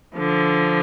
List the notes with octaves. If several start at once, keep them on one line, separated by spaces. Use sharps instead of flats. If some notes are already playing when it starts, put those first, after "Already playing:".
D3 F3